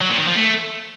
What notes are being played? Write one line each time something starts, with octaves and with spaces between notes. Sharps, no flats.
F#3
A#2
D#3
F3
A3